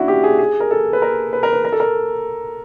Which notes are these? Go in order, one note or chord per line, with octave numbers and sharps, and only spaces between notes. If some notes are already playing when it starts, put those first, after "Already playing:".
Already playing: C#4 D4 E4 F#4
G4
G#4
G#4
A#4
A4
B4
A#4
B4
A#4
B4
A#4
A4
A#4